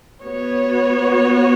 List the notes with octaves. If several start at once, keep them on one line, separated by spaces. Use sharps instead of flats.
B3 F#4 C#5